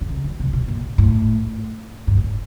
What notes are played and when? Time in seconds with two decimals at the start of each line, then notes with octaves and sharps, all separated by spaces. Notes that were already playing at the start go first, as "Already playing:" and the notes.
0.01 D3
0.09 C#3
0.24 D3
0.39 C3
0.53 B2
0.68 A#2
0.98 A2
2.07 G#2
2.17 A2